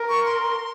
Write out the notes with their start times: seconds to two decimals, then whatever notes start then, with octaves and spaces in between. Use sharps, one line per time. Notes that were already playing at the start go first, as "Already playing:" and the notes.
Already playing: A#4
0.09 C#6
0.26 C6